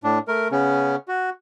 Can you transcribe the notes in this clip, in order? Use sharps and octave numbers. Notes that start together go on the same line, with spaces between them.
A2 D4
A3 A#4
C#3 B3 C#4
F#4